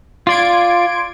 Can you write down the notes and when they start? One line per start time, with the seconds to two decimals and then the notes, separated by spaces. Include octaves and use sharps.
0.27 F4 D5 C6 G#6 D7